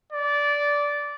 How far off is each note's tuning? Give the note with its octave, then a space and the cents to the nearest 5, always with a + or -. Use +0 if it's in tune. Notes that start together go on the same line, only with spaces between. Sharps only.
D5 -15